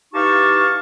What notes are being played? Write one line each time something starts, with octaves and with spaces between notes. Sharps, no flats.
E3 D#4 G4 F5 A5 C#6